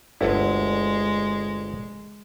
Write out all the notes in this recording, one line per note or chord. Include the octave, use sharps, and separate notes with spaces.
G1 D2 G#3 E4